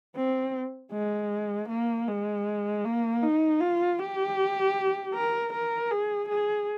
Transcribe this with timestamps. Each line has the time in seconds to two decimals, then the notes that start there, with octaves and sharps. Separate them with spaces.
0.16 C4
0.92 G#3
1.69 A#3
2.08 G#3
2.85 A#3
3.23 D#4
3.61 F4
3.99 G4
5.14 A#4
5.53 A#4
5.91 G#4
6.29 G#4